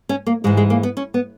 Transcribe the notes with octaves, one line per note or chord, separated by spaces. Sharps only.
C#4
A#3
G#2 E3 G#3
G#3
A#3
B3
C#4
B3